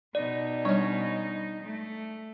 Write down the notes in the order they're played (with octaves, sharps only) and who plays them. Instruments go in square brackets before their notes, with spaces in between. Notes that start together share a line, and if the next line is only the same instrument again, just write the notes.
[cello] B2 D#4 [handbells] D5
[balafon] G3 D4 [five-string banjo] C#4 C#5
[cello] A3